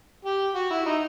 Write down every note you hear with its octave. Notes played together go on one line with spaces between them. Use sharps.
G4
F#4
E4
D#4